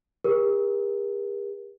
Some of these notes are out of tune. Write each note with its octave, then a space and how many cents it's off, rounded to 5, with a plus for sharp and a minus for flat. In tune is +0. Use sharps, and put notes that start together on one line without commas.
G4 +45 A#4 +35